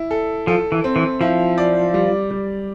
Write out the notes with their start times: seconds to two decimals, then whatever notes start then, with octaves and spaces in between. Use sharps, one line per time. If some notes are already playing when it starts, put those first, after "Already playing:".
Already playing: E4
0.11 A4
0.47 F3 A4
0.72 E3
0.84 C4
0.96 E3
1.21 F3 E4
1.58 D5
1.94 G3
2.31 G3